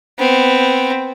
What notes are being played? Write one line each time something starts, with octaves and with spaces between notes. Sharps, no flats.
B3 C4